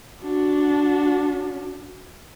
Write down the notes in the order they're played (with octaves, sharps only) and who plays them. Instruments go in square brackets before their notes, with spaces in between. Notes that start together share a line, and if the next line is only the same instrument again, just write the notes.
[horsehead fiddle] D4 F#4